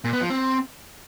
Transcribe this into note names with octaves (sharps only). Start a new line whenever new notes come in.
A#2
B3
F3
C4